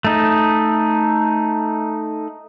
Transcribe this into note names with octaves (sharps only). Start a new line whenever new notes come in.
A3 D#4